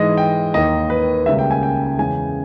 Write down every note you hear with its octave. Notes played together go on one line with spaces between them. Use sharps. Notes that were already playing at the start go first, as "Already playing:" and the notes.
Already playing: G#2 E3 G#3 D#5
G5
D#2 D#3 A#3 D#5
B4
C#2 C#3 G3 A#3 E5
G5
G#5
G5
E2 C#3 G#3 G#5